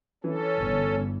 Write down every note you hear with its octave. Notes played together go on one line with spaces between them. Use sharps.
E3 C#4 A4
G1